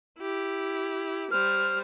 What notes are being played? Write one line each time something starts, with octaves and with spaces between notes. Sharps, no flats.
E4 G4
G3 C5 F6